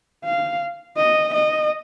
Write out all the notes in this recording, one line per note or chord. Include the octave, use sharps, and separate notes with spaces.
F5
D#5
D#5